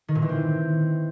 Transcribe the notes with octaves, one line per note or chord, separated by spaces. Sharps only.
D#3
A#2
E3
C4